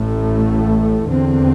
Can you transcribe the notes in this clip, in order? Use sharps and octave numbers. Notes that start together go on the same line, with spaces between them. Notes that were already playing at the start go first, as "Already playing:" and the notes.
Already playing: A1 A2 A3
E2 D3 C4